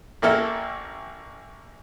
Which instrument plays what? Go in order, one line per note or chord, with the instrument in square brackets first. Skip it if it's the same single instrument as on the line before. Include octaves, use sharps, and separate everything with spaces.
[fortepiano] A1 A#3 E4 A4 F6